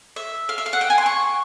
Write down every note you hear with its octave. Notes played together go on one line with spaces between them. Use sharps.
E5
F5
E5
F5
F#5
G5
G#5
C6
C#6